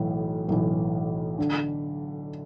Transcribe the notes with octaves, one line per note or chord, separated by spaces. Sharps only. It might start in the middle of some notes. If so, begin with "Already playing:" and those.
Already playing: B1 A2 E3
B1 A2 E3
D3